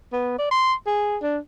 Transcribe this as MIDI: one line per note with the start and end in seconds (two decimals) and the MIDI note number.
0.13 0.38 59
0.39 0.48 74
0.51 0.73 84
0.86 1.17 68
1.22 1.38 62